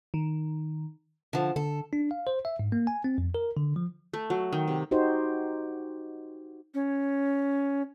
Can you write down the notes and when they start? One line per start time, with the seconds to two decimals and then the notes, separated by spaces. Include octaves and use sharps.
0.14 D#3
1.33 D3 F3
1.56 D3 A4
1.93 D4
2.11 F5
2.27 C5
2.45 E5
2.59 G#2
2.72 A#3
2.87 G#5
3.04 C4
3.18 F2
3.35 A#4
3.57 D3
3.76 F3
4.13 A3
4.30 F#3
4.52 D#3
4.68 C3
4.91 D#4 F#4 G4 C5
6.74 C#4